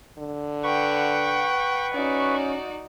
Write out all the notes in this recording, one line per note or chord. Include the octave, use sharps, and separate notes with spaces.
D3
B4 F#5 G5 C#6
C#4 D#4 F#4 D5